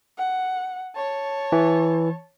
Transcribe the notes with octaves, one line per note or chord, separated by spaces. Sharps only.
F#5
C#5 A5
E3